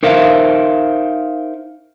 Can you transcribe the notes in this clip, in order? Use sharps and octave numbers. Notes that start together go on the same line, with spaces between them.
D#4 A#4 C5 E5 F5